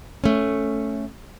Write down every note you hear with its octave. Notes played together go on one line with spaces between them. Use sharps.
A3 C#4